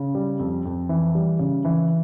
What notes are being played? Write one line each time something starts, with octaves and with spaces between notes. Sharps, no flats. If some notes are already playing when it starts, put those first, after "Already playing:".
Already playing: C#3
G3
F2
F2
E3
G3
C#3
E3